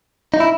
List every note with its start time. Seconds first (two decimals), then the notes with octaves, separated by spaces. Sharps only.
0.34 D#4
0.40 E4